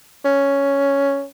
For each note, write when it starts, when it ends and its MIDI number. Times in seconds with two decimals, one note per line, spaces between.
0.25 1.25 61